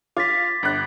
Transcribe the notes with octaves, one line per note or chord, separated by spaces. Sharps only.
F4 D6 A6 B6
G1 F#6